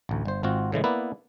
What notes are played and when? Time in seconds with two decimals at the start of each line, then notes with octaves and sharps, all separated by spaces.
0.09 A1 D2
0.25 G1 C5
0.43 G#1 C4 F4 F#4
0.72 A2 C#3 E3 G#3
0.84 A#3 B3 E4 B4 D5